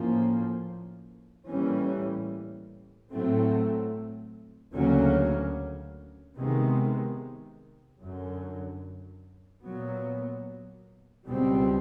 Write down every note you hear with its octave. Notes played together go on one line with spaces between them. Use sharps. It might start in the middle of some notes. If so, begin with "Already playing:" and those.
Already playing: A2 F3 A#3 C#4
A2 E3 G3 A#3 C#4
A2 F#3 A3 C4
D2 C#3 F#3 A#3 C#4
C3 D#3 G#3 B3
F#2 D3 F#3
A#2 F#3 B3
C#2 B2 G3 C4